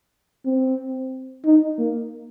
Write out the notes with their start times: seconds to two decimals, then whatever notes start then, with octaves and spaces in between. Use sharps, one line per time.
0.45 C4
1.45 D#4
1.78 A#3